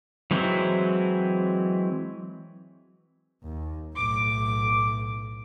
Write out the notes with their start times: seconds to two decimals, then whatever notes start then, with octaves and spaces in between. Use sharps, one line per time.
0.31 E3 F#3 G#3 C4 E4
3.44 D#2
3.96 B1 A2 D6